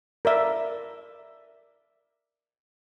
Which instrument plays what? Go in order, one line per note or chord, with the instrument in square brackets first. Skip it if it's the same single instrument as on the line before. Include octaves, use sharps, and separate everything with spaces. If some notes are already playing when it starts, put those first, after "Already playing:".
[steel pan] A#4 D5 E5